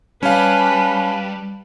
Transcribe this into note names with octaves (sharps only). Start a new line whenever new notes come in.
G3 C#4 B4 F5 A5